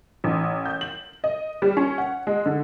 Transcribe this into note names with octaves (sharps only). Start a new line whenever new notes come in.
A1
G6
F#7
D#5
G3
C#4
F#5
G#3
D3